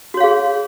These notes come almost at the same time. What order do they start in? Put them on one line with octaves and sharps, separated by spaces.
F#4 C#5 F5 G#4